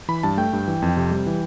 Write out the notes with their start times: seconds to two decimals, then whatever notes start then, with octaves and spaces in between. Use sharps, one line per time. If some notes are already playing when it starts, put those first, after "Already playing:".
0.08 E3 B5
0.23 G2 A5
0.37 A3 G5
0.53 G2
0.68 E3
0.82 F2
0.97 C3
1.11 G3
1.26 E3